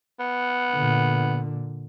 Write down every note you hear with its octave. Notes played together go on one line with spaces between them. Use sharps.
B3
A#2 D3